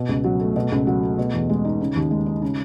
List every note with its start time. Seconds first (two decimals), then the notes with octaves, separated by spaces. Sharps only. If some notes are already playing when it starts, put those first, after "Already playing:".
Already playing: B2
0.09 C#2
0.24 F#3
0.41 A3
0.56 B2
0.72 C#2
0.87 F#3
1.03 A3
1.18 B2
1.34 E2
1.49 G#3
1.65 D#4
1.81 C#3
1.96 D#2
2.11 G#3
2.26 D#4
2.42 C#3